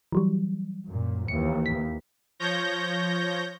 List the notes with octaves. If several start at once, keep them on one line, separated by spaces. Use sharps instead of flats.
E3 F#3 G3
F#2 A#2
D#2 E3 C#7
B6
F3 C#5 G6 A#6